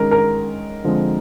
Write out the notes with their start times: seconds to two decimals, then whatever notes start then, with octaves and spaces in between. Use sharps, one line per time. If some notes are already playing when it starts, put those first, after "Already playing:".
Already playing: D#3 G#3 C#4 A#4
0.11 A#4
0.84 D3 F3 G#3 C4